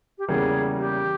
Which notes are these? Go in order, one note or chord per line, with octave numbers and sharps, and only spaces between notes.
G4
E2 C#3 G3 A#3 G#4
G4